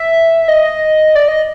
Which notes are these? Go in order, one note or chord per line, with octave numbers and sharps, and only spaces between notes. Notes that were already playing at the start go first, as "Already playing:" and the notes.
Already playing: E5
D#5
D5
D#5